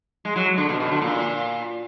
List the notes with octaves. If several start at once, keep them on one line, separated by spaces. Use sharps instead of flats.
G#3
F#3
D3
B2
B2
D3
A#2